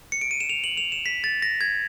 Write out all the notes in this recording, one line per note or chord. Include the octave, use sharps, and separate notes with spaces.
C#7
D7
D#7
E7
F7
F#7
F7
E7
B6
A6
A#6
G#6